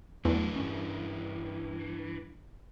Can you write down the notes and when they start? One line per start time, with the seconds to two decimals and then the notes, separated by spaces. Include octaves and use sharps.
0.25 E2 E3 F#3 A3 D4
0.56 G2 C#4